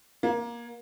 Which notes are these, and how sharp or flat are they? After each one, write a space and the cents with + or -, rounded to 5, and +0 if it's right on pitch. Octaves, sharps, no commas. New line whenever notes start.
A#3 +20